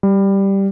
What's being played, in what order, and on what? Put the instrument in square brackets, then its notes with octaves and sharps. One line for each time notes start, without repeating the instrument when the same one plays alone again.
[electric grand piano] G3